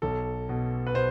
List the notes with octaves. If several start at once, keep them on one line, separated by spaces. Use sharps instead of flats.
B1 A4
B2
B4
B2 C5